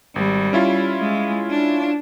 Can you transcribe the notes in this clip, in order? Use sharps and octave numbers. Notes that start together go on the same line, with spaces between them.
G#1 G3
C#4 E4 F4
G#3
D4